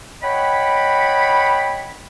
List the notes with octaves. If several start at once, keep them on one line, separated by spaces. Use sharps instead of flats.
C#5 D#5 F#5 G5 B5